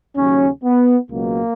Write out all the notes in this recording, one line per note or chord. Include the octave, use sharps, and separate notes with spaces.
D#2 C#3 F#3 C#4
B3
C#2 B2 F#3 A#3